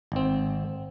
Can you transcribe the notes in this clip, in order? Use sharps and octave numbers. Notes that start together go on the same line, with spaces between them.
G#1 C4